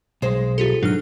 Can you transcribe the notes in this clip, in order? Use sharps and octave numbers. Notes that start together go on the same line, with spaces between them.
B1 G#3 C5
F4 G4 A4
G#2 D#3 F#3 D4 A4 F6